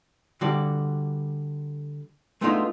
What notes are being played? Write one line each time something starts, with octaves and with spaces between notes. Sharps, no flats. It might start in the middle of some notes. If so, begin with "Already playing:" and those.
D3 G3 F#4 D5
G#3 A3 B3 D4 D#4 F4